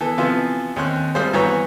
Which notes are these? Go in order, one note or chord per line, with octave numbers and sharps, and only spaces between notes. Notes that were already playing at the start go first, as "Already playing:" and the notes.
E3 B3 A4
C3 E3 F3 B3 F4
D#2 C4 C#4 F#6
G3 A3 C4 F4 G#4 C5
G2 E3 B3 F#4 C#5 A#5